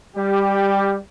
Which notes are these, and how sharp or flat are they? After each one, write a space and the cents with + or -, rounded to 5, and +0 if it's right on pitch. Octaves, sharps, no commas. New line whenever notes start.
G3 +15 G4 +0